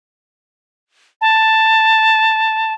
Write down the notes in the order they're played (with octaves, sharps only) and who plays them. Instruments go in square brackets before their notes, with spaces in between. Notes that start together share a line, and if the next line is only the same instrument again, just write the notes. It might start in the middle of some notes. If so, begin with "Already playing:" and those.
[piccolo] A5